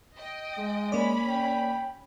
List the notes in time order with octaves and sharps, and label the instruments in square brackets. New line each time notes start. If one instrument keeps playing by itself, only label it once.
[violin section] D#5 G5
[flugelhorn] G#3
[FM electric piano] A#3 D5 [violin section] C#4 B5
[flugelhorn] G5